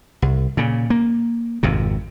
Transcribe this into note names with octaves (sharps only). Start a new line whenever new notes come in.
C2
A#2 C#3
A#3
G#1 F2 C3